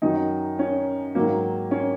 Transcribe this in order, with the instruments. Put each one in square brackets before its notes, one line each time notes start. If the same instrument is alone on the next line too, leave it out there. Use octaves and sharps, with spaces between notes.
[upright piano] F#2 D#3 F#3 D#4
C#4
G#2 D#3 F#3 A#3
C#4